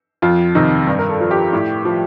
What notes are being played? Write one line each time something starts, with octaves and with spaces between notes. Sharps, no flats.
F2 F4
C3 D#3 D#4
G2
A#4
A4
F3
G4
A2
F3